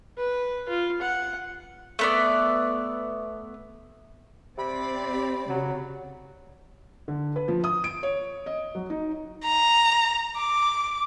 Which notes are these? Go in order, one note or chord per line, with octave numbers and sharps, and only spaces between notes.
B4
F4
F#5
A3 B3 D5
C3 C4 D5 B5
G4
C#3 F#3
D3
B4
F3
D#6
D7
C#5
D#5
F#3
D#4
A#5
D6